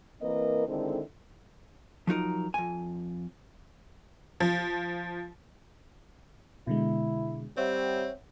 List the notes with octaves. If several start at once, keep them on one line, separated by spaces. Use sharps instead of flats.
E3 A#3 C4 A#4 B4 D#5
D3 D#3 G#3 C4 E4 A4
F3 F#3 D#4 A#4
F2 G#5
F3
B2 D3 G#3 E4
G3 C4 C#5 E5 F#5